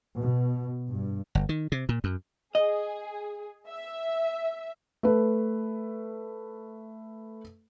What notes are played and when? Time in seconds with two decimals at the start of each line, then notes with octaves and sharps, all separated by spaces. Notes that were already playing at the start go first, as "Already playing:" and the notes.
0.18 B2
0.93 G2
1.35 G1
1.49 D#3
1.72 C3
1.89 A#2
2.04 F#2
2.55 G#4 D#5
3.68 E5
5.03 A3 B4